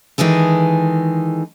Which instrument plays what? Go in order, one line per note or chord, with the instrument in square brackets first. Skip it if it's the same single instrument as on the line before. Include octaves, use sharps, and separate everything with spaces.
[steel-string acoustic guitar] D#3 E3 G#3 G#4 A4